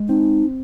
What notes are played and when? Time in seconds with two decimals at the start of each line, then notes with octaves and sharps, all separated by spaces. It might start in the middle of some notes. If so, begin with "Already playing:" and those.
Already playing: G#3
0.08 C4 D#4